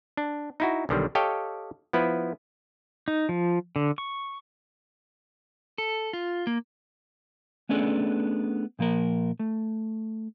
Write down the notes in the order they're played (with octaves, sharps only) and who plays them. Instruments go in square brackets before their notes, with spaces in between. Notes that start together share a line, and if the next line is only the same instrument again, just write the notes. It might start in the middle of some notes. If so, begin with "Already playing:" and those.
[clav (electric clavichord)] D4
D#4 E4 F#4
B1 D3 D#3 G3
G4 A4 C#5 D#5 F5 G5
F3 B3 E4 B4
[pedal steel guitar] D#4
F3
D3
C#6
[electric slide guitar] A4
F4
A#3
[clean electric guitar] A3 B3 C#4 D4 G#4 A4
A#2 F3 A#3 A#4
A3